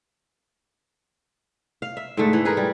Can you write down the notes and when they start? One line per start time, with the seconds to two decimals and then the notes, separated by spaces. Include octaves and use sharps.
1.82 F5
1.97 E5
2.17 G#2 D3 A3
2.33 E3
2.45 G#4 A#4 B4
2.57 G3